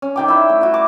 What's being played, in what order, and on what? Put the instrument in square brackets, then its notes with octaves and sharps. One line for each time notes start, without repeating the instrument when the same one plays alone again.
[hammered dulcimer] C#4
D#3 G5 D6
E4 E5
A3
F#4 E5
D6